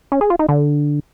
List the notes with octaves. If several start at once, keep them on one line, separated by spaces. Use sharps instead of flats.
C#4
G#4
F4
D#4
D3